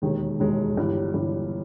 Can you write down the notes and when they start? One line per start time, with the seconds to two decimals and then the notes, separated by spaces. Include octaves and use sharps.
0.02 E1 D#2 D#3 G#3
0.40 E1 D#2 D#3 G#3
0.77 G1 G2 E3 G3
1.14 G1 G2 E3 G3